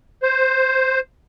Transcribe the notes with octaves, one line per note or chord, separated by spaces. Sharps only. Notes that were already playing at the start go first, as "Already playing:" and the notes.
C5